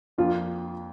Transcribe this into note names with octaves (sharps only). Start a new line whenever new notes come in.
F2 F3 A#3 D4 F4